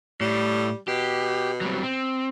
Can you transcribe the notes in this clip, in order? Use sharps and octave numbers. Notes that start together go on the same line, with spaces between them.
A2 G3
B2 G4
F#3 G3 C4
C4